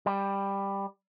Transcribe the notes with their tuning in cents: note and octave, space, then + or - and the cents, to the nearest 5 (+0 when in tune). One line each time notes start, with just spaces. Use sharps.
G3 +10